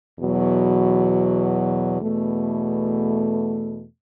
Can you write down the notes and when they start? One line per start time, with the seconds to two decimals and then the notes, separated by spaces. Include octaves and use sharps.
0.19 E2 B2 F#3
2.01 E2 B2 A3